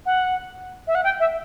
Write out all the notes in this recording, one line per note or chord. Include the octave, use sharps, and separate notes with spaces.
F#5
E5
F#5
G5
E5